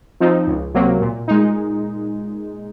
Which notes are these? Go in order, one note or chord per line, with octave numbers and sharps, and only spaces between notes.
F3 C4 D#4
C#2
C3 F#3 A#3
A#2
G#3 D#4